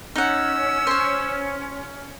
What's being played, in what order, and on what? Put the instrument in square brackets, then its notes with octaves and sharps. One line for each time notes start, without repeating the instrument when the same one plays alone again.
[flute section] C#4 [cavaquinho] D#4 F#5 [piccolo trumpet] E6
[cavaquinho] C5 C#5